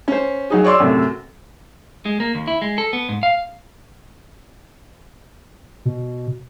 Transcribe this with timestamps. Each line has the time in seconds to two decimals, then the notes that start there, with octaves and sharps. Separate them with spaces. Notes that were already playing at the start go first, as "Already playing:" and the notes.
0.08 C#4 C5
0.50 F#3 D#4 G#4
0.64 C#5 D5 C6 D6 E6
0.80 F#2 A2 C3
2.05 G#3
2.20 A#3
2.35 D#2
2.48 E4
2.62 G#3
2.78 A4
2.93 B3
3.09 G#2
3.23 F5
5.85 B2